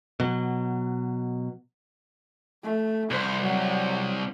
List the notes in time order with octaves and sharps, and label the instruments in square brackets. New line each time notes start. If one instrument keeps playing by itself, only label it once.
[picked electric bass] B2 F#3
[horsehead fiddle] A3
[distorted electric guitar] C2 [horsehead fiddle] C5
[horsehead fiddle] F#3 C4